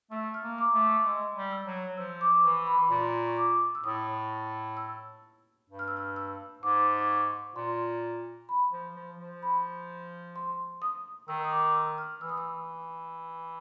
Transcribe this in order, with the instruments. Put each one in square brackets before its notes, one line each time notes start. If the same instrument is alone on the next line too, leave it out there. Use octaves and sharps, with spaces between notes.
[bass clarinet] A3 [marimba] E6
[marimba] F6
[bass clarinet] A#3
[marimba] D6
[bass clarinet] A3
[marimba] D6
[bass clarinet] G#3 [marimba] E6
[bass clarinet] G3
[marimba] E6
[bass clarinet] F#3
[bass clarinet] F3 [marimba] E6
[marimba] D6
[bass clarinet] E3 [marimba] C#6
[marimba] B5
B5
[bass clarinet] A#2 [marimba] C6
[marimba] C#6
D6
E6
[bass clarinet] A2 [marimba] D#6
[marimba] E6
[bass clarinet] G2
[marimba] F6
E6
F6
E6
[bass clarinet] G#2 [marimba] D6
[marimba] D6
C#6
[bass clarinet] A#2 [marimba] C6
[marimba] B5
[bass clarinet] F3
F3
F3
[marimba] B5
C6
D#6
[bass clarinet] D#3 [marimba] E6
[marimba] D#6
D6
E6
F6
[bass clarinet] E3 [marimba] E6
[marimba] D#6
E6